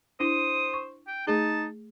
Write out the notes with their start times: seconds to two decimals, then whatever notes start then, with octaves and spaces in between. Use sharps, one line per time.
0.20 D4 E4 C5 D#6
0.74 C#6
1.07 G5
1.27 A3 D#4 G#4 A5